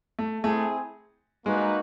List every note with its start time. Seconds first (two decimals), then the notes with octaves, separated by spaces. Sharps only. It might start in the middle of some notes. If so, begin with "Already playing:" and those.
0.19 A3
0.44 A3 C4 E4 G#4
1.46 G#3 A#3 D#4 F#4 B4